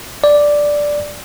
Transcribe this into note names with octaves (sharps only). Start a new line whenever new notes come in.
D5